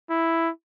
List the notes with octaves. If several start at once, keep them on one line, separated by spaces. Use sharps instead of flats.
E4